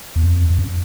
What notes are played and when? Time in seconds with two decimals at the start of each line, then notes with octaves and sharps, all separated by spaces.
0.16 E2
0.23 F2
0.50 F2
0.59 F#2